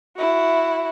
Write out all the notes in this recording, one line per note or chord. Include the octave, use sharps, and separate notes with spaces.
E4 F#4